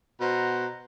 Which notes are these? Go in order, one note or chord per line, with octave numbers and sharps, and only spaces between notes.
B2 C5 F#5 A#5